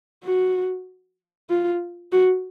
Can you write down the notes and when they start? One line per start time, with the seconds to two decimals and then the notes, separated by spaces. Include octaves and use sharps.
0.24 F#4
1.50 F4
2.12 F#4